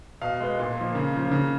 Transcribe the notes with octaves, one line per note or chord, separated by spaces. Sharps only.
B2 F5
G#3 B3
A#2
F3 A#3
C#3
F3 A#3
C#3